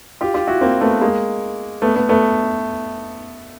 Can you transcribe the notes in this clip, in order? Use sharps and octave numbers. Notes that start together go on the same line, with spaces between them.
F4 G4
F4 G4
E4 F#4
A#3 C4
A3 B3
G#3 A#3
A3 B3
A3 B3
A3 B3